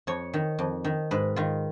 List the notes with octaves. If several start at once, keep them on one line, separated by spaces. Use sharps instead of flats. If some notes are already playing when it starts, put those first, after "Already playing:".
F2 C#5
D#3
F2
D#3
G#2 B4
D#3 F4